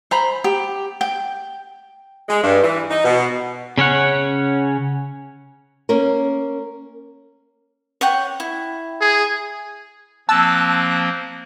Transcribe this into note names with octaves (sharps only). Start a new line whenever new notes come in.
C5 A#5 B5
G4
G5
G#3
G2
E3
D#4
B2
C#3 C#4 C#5 F#5
A#3 C#4 A#4
C#5 F#5 G5
E4
G#4
F3 A#3 C4 A5 E6 F#6